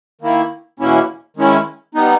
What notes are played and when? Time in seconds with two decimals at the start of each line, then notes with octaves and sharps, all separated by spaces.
0.22 D#3 A#3 E4
0.79 E2 B2 A#3 C#4 E4
1.37 D#3 G#3 C#4 E4
1.95 G3 B3 D#4